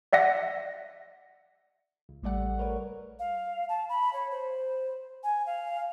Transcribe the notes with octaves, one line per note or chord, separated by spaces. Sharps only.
D5 E5 F#5 A#6
C#2
A1 G3 A3 D5 F#5
A3 A#4 B4 C#5
F5
A5
B5
C#5
C5
G#5
F5